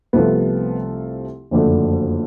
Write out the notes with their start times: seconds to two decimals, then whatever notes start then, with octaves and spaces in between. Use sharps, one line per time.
0.13 C2 C3 F3 A3 B3
1.51 F#1 F2 D3 F#3 A3